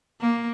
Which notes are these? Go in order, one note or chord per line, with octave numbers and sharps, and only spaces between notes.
A#3